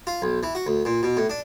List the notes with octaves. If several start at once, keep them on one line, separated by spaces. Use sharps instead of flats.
F4
B1
E3
F#4
D2
A#2
B2
A2
D4